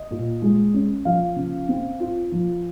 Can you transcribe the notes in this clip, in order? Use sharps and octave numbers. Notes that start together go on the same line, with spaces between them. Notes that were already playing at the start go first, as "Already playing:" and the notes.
Already playing: D#5
A#2
G#3
C#4
F3 F5
C#3
C4
F4
F3